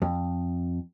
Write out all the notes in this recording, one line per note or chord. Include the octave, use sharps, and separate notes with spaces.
F2